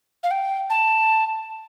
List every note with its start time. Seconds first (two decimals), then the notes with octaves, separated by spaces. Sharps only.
0.23 F5
0.31 G5
0.70 A5